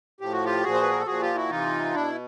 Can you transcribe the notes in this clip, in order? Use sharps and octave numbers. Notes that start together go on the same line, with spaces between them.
A2 F3 G4
F#4
F4 G4
A#2 F3 F#4 G#4
C5
B4
A#4
A4
A#2 F3 F#4 G#4
F4 G4
E4 F#4
C3 E3 D#4 F4
B2 D4 E4